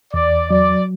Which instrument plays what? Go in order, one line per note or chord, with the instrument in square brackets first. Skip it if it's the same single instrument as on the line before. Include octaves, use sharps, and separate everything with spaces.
[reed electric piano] E2 [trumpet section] D5
[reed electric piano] F#3 [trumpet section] D5